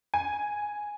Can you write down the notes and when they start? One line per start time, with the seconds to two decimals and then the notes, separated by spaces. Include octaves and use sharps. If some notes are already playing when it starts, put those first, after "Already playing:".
0.14 G#5